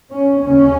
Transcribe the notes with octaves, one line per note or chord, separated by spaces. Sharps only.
C#4
D#2 C#3 C#4